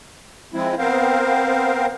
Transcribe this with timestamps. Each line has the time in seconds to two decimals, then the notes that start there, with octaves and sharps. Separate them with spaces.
0.54 F3 G#3 C4 E4
0.78 B3 C4 A#4 C5 F5